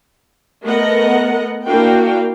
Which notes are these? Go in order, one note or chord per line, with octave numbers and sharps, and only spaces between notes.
A3 B3 A4 A#4 D#5 F#5
A#3 D4 E4 F#4 F5 G5